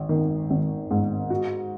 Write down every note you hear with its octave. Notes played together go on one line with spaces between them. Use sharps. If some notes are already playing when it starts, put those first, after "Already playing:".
Already playing: G#1
D#3
G#1
G#2
F#4